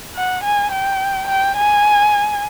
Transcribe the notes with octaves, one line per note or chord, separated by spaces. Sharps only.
F#5
G#5
G5
G5
G#5